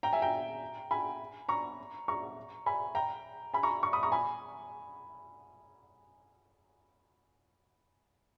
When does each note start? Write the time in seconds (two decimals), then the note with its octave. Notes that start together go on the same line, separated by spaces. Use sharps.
0.03 G5 A#5
0.13 E5 G#5
0.22 G5 A#5
0.91 G#5 B5
1.49 A#5 C#6
2.08 A#5 C#6
2.66 G#5 B5
2.95 G5 A#5
3.54 G#5 B5
3.63 A#5 C#6
3.83 A#5 C#6
3.93 B5 D#6
4.03 A#5 C#6
4.12 G#5 B5